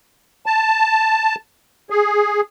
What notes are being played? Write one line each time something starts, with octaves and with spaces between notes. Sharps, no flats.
A5
G#4